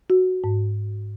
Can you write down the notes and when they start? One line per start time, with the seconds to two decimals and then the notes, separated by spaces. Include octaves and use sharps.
0.10 F#4
0.44 G#2